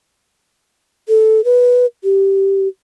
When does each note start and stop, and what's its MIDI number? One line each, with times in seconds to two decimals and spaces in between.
1.09 1.44 69
1.44 1.86 71
2.04 2.68 67